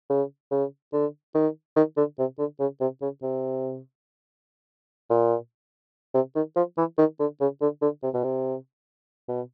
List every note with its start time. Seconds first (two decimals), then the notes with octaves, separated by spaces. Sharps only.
0.10 C#3
0.51 C#3
0.93 D3
1.35 D#3
1.76 D#3
1.97 D3
2.19 C3
2.39 D3
2.60 C#3
2.81 C3
3.02 C#3
3.23 C3
5.10 A#2
6.14 C3
6.36 D#3
6.56 F3
6.78 E3
6.98 D#3
7.20 D3
7.41 C#3
7.61 D3
7.82 D3
8.03 C3
8.14 B2
8.24 C3
9.29 B2